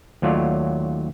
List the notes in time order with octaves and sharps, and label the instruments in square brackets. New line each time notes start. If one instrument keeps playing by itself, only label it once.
[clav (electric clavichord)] D#2 F#3 A3 F4 C#5 D5